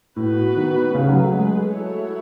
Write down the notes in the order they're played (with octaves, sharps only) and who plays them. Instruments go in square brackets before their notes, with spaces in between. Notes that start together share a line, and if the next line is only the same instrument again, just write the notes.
[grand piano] A2 [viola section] B3 F#4 B4
[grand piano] D#3
[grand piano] C#3 [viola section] A3 C#4 G#4 B4
[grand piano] F#3
F#3
G#3
[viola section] F#3 A3 E4 A4 C#5